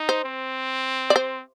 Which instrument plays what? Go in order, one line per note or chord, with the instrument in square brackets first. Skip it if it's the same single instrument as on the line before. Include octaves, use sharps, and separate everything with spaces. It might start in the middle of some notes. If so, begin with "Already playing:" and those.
Already playing: [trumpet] D#4
[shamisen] C5
[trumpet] C4
[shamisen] D5
C5